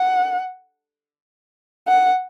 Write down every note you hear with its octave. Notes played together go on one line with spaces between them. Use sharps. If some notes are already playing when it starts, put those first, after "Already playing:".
Already playing: F#5
F#5